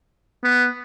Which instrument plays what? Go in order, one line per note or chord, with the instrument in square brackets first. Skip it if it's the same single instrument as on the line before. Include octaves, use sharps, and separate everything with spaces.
[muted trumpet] B3